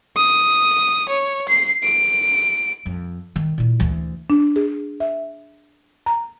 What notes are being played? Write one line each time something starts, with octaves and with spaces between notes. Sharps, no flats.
D#6
C#5
C7
D7
F2
D#3
A#2 E4
D2 E3
D4
G#4
E5
A#5